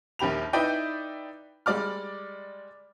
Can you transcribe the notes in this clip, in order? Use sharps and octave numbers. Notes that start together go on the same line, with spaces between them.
A#1 D#2 G4 B5 F7
D#4 E4 B4 D5 D#5 G5
G3 G#3 D5 D6 F6